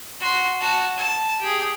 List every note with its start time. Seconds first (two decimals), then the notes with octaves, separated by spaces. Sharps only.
0.20 F#4 C6
0.60 F#4 A5
0.97 A5
1.40 G4 G#4